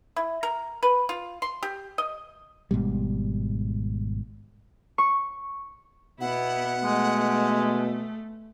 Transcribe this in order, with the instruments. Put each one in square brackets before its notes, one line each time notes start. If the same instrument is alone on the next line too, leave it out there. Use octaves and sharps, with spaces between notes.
[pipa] E4
A#4
B4
F4
C6
G4
D#5
[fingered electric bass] G#1 G#2 B2 G3
[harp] C#6
[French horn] B2 [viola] B3 E4 [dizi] F#5
[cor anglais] G#3 [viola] A3